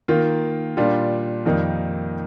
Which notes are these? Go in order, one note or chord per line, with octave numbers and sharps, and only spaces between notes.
D#3 A#3 F4
A#2 G3 D4 F4
F2 D#3 G3 A#3 D#4